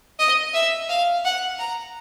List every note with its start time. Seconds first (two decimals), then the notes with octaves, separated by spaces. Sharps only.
0.19 D#5
0.54 E5
0.89 F5
1.25 F#5
1.59 A#5